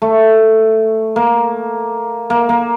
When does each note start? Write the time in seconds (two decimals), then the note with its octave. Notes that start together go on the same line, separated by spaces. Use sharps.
0.02 A3
1.16 A#3
2.30 A#3
2.49 A#3